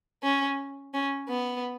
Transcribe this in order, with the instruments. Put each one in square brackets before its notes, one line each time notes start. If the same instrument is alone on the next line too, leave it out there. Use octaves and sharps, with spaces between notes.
[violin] C#4
C#4
B3